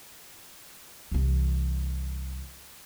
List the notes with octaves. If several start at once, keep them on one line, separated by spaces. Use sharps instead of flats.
C2 E3